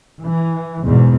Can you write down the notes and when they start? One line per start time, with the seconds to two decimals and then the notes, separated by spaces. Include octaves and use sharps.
0.21 E3
0.84 E2 G#2 B2